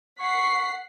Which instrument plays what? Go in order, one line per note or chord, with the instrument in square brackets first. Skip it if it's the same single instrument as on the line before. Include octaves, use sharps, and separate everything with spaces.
[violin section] F#5 B6 C7 [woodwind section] C#6